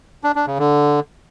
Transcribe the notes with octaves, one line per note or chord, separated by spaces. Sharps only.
D4
D4
C#3
D3